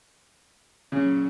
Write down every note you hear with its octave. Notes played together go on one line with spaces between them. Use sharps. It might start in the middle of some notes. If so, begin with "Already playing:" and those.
A#2 C#3 F#3 C#4